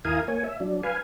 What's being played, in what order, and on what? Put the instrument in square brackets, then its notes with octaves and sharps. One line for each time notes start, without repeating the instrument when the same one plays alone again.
[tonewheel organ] D#2 E4 A#4 F5 G#5 D#6
A#3 C#5 G#5
E5
F#3 D4
B4 F5 G#5